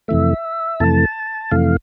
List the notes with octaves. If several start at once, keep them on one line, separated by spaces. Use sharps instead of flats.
F2 C3 E3 A3 E5
F2 C3 E3 A3 A5
F2 C3 E3 A3 F5